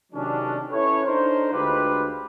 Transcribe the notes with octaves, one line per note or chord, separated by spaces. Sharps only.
C3 D#3 F#3 G#3 C#4 D4
C#4 E4 A4 B4 C#5
D4 D#4 A4 A#4 C5
D2 D3 G#3 F4 G4 B4